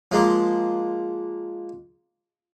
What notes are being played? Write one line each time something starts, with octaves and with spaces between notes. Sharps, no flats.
F3 G#3 A#3